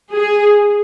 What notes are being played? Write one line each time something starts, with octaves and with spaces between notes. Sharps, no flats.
G#4